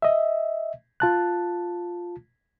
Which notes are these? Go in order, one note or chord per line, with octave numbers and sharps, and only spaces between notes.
D#5 E5
F4 A5 F#6